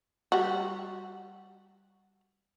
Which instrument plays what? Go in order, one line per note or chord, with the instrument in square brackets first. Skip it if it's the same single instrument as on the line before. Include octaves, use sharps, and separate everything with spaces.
[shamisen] G3 F#4